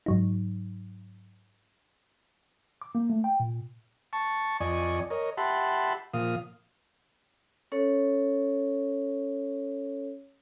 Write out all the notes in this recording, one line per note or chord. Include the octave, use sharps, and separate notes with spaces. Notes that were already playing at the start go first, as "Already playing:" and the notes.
G#2 F#3 D#4
D6
A#3
A3
G5
A#2
A5 C#6
F2 D5 D#5 G#5 C#6
A#4 C#5 D#5
G4 E5 F#5 A5 B5 C6
A#2 F3 F5 D#6
C#4 A4 C#5